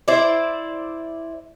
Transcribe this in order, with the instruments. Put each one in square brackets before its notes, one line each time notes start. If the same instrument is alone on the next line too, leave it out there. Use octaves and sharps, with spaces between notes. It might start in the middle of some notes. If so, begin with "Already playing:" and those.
[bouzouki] E4 C5 D5